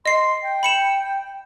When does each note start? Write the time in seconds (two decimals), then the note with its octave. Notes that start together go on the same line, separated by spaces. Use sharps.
0.06 D#5 C6 C7
0.43 G5
0.63 B5 C#7 E7